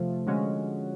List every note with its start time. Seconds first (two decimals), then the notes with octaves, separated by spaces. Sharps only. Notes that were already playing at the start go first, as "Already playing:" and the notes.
Already playing: C3 F3 A3
0.27 D3 F3 G#3 C#4 F#4